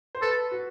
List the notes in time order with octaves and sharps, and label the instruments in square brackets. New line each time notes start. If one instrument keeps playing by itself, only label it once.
[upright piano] C5
[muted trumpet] A4 [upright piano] B4
[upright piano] F#4